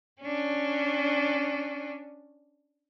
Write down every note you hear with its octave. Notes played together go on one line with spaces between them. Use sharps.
C#4 D4